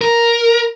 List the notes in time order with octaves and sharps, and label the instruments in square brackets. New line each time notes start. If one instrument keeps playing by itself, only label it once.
[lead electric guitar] A#4